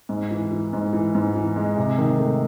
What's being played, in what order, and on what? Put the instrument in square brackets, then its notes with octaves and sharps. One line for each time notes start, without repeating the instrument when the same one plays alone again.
[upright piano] G#2
E3
E3
G#2
E3
G#2
E3
G#3
C3
D#3
A3